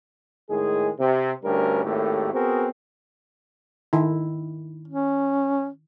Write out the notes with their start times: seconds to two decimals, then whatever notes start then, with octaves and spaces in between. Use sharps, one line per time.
0.49 A2 D#3 G#3 G#4
0.98 C3
1.43 D2 G2 G3 C#4 A#4
1.83 G#1 D#2 A2 A3 G4
2.33 B3 C4 F#4 G#4 A#4
3.93 D#3 E4
4.88 C#4